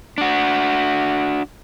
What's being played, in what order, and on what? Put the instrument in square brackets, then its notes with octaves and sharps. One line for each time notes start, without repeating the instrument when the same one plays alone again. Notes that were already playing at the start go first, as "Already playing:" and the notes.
[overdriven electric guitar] D4 F#4